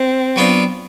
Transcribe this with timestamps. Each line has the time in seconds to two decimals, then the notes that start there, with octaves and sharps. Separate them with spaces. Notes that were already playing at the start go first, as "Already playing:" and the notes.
Already playing: C4
0.36 F#3 B3 D4 F4